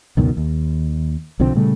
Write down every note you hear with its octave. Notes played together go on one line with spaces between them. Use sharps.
C#2 F#2 B2 D#3
D#2
B1 D3 F3 C4
A#2 C#3 G3 A3